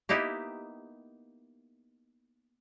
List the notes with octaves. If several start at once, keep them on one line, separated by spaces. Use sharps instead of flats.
A#3 B3 D#4 E4 G4